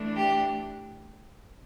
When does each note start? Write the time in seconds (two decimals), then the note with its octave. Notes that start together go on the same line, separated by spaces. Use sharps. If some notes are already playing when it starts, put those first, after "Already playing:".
Already playing: E3 A3 D4
0.16 G4